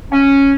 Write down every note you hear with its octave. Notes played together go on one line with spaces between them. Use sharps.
C#4